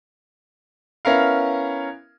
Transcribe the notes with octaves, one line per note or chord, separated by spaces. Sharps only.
B3 C#4 E4 A#4 F5